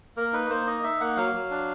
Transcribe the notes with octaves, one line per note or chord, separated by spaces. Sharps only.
A#3 A#4
D#4 B4
A#3 C5
D#4 D#5
D#4 E5
A#3 F#5
F#3 F5
F#3
D4